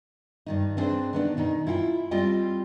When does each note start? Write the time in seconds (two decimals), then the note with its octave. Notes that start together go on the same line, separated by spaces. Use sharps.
0.46 G2 D#3 D#4
0.77 B3 C4 D4 G#4 B4 C5
1.13 D#3 B3 D4
1.37 B2 D#3 D#4
1.67 E4 F4 F#5 G5
2.11 G3 C4 F4 G4 D#5 G5